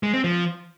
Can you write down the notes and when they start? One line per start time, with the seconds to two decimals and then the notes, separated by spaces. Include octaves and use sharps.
0.03 G#3
0.14 C4
0.24 F3